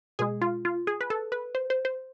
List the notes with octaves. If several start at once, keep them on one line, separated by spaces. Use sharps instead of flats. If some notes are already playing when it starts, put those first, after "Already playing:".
B2 G#3 G#4
F4
F4
G#4
B4
A4
B4
C5
C5
C5